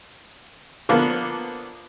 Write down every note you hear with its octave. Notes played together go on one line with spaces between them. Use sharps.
D3 F3 A#3 B3